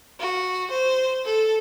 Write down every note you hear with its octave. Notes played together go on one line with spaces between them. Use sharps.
F#4
C5
A4